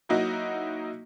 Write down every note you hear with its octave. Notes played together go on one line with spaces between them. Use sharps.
F#3 A#3 D#4 E4 F#4 D#5